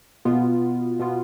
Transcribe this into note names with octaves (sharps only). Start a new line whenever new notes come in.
B2 B3 F4
B2 B3 F4